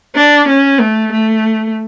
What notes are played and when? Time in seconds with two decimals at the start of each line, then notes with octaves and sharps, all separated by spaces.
0.15 D4
0.48 C#4
0.80 A3
1.12 A3